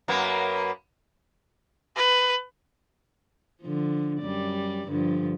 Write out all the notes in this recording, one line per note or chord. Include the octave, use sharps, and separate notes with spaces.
F#2 A#3 B3
B4
D3 F3
F#2 G3 D5
G2 D3 F3